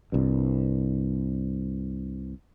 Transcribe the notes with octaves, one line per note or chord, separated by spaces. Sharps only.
C2 G2